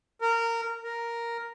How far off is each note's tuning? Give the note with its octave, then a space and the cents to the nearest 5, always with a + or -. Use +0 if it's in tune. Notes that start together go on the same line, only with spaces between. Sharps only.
A#4 -20
A#4 +0